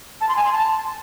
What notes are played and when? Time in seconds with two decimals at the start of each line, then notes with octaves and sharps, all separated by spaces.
0.21 A5
0.29 C6
0.36 G#5
0.44 C6
0.52 A5